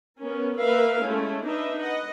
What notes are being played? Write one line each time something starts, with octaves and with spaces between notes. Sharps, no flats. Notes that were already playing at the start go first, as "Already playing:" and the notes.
B3 C#4 A#4
A#3 A#4 B4 E5 F5
G#3 A3 C#4 E4
D4 D#4 B4 D#5 E5
B4 D#5 F#5